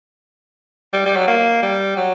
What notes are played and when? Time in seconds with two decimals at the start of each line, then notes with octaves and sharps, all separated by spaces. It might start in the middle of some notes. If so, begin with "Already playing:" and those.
0.93 G3
1.06 G3
1.17 F#3
1.28 A#3
1.63 G3
1.97 F#3